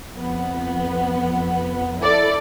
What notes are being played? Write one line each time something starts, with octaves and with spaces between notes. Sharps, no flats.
F2 B3
E4 A4 D5